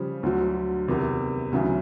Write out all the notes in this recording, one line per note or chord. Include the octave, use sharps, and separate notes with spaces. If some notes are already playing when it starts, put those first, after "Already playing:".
Already playing: C#3 F3 G3
D2 D3 F#3
E2 C3 D#3
D2 C#3 E3 F#3